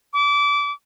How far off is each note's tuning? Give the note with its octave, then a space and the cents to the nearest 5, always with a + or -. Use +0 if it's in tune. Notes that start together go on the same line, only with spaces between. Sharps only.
D6 -25